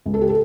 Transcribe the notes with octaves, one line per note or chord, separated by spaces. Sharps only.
C#2
A4
G4
A4